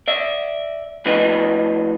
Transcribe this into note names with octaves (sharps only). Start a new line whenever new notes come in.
D5 E5
A2 F3 D4 F#4 B4 D#5